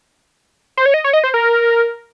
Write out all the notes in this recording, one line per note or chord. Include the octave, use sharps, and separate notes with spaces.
C5
C#5
D#5
C#5
D#5
C5
A#4